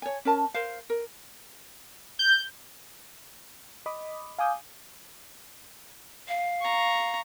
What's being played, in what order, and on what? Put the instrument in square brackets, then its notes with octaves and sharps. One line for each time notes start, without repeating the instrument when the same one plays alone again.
[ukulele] C#5 G#5
C#4 A#4 A5
A#4 C5 F5
A#4
[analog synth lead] G6
[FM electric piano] D#5 B5 D6 D#6
F5 G#5 D6 D#6 G6
[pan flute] F5
[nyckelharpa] A#5 C#6